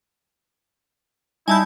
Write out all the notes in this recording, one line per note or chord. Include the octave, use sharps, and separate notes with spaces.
G3 D#4 E4 G#5 A5 G6